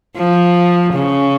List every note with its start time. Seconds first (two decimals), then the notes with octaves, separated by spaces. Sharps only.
0.17 F3
0.94 C#3